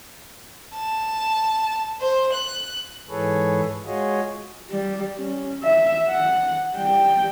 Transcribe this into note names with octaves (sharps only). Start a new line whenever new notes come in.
A5
C5
F#6
G#2 E3 G#4 A4 B4 C#5
G#3 F4 F#4 G#4 C#5 D#5
G3
C#4
E5
F#5
G3 G5